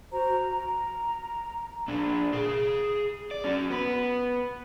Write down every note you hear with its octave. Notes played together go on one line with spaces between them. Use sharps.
F#4 C5 A#5
A#5
A#2 D4
G#4 F5
D5
C#4 F#4
B3 B4